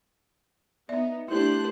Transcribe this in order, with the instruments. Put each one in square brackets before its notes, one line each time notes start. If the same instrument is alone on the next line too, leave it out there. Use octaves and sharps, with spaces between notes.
[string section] B3 D#4 [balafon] D5 E5
[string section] A3 D4 F#6 [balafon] E4 [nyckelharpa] G4 C5